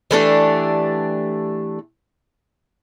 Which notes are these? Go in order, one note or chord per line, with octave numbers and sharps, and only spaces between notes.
E3 A3 D4 G4